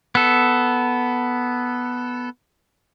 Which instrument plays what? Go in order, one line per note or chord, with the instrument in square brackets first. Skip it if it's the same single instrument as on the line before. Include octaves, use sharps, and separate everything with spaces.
[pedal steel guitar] B3 A4